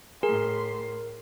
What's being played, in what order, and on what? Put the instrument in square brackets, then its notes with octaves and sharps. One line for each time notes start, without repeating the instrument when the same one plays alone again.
[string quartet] A2 C6 [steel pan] G#4 [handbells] A#4